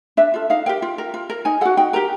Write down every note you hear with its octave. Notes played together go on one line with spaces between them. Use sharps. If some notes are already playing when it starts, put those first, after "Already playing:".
D4 E5
F4 A4
D#4 F5
G4 A#4 G5
F4
A#4
F4
A#4
D#4 G#5
F#4 A4 F#5
D#4 G5
G4 A#4 A#5